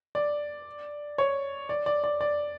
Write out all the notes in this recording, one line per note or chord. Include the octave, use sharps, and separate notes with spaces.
D5
C#5
D5
D5
D5
D5